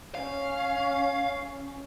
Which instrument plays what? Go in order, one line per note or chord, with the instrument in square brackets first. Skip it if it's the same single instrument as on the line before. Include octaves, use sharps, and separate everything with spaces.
[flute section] C#4 [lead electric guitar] F5